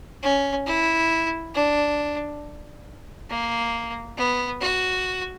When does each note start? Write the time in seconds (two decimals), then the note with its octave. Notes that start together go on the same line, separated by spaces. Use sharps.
0.23 C#4
0.66 E4
1.54 D4
3.30 A#3
4.18 B3
4.61 F#4